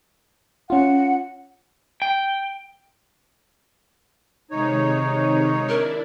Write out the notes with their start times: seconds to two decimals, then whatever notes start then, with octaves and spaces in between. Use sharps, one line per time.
0.70 C#4 F4 F#5
2.02 G5
4.51 C3 D#3 G#3 D#4 C#5
5.69 D4 E4 A#4 D5